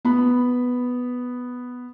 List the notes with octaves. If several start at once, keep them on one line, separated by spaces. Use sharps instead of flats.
B3 B5